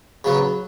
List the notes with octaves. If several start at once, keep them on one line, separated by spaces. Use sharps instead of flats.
C#3 F#3 B3